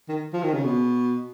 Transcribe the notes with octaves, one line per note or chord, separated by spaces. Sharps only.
D#3
F3
D#3
C#3
B2